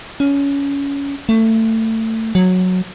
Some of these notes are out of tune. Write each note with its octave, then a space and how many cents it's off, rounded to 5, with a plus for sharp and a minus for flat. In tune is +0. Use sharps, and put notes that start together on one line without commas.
C#4 +20
A3 +25
F#3 -10